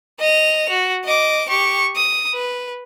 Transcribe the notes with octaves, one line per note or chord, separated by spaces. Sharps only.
D#5 F7
F#4
D#5 D6
G4 C#6
D#6
B4